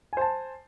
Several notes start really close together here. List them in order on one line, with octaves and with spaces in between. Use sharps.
G#5 C5 A5